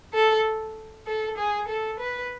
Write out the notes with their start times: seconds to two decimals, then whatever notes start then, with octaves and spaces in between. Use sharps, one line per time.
0.14 A4
1.07 A4
1.37 G#4
1.68 A4
2.00 B4